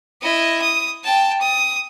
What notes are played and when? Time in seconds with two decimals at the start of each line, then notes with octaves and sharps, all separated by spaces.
0.22 E4 D#5
0.61 D#6
1.03 G5 A5
1.41 D#6